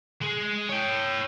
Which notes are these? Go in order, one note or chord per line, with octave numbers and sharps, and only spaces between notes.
G#3 G#4
C#5 G5